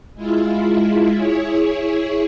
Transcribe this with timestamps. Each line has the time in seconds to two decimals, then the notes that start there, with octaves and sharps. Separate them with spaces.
0.15 G#3 E4 F4
1.14 E4 G#4 C#5